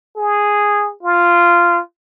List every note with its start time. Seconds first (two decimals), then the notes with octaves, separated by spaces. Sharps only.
0.17 G#4
1.03 F4